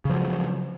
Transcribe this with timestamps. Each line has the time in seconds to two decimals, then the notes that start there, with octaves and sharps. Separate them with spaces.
0.05 C#3
0.10 F3
0.14 F#3